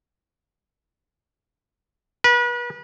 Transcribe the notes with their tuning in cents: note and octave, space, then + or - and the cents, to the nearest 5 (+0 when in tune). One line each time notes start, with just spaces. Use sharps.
B4 -35